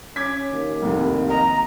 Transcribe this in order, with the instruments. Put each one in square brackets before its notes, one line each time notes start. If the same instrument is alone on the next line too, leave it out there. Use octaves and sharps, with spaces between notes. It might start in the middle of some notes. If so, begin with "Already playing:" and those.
[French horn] C#4 [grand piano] D6 G#6 B6
[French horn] D#2
[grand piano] F1 C2
[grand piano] D#5 [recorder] A#5